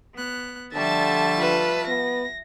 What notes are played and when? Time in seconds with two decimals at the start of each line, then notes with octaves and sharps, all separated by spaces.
0.15 B3 F#6
0.74 D3 F3 G3 A3 E5 A5 A6
1.37 F4 B4
1.87 B3 A#6